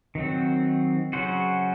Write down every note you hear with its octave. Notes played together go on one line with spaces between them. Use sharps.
D#3 F#3 C4
C#3 F#3 C#4 F#4 C5